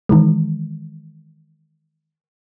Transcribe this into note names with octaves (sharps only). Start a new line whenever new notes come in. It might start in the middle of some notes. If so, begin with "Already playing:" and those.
D#3 E3 G#3